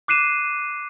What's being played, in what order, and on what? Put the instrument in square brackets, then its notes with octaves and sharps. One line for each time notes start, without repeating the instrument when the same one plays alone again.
[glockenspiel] D6 F#6 C7 D#7 E7